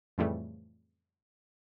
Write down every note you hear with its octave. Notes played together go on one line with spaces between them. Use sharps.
F2 A2 C#3 E3 G3 A3